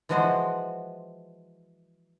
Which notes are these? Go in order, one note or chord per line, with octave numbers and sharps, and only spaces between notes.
E3 F3 G#3 F#4 C5